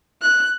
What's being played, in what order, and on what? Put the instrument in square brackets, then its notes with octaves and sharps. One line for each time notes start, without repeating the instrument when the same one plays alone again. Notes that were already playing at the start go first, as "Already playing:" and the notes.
[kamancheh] F#6